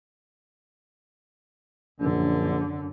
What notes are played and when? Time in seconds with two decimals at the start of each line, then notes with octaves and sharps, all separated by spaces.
2.01 A#1 F#2 D3